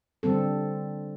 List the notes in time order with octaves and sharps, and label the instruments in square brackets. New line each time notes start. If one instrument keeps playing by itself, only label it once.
[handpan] D3 G3 C4 A4